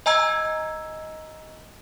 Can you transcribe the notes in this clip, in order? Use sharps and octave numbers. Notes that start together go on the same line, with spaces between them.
D#5 G#5 A#5 E6 G#6